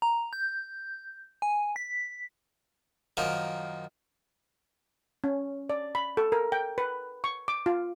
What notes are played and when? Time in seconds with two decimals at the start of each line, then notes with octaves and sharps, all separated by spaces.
0.02 A#5
0.33 G6
1.42 G#5
1.76 B6
3.17 F#2 D#3 F3 A#3
5.24 C#4
5.70 D5
5.95 B5
6.17 A4
6.32 A#4
6.52 G5
6.78 B4
7.24 C#6
7.48 D6
7.66 F4